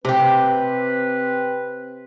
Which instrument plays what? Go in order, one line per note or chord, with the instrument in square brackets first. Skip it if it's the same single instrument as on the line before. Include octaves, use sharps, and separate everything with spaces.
[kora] C3 G4 [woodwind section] C4 B4